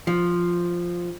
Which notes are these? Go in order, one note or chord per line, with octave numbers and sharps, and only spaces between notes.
F3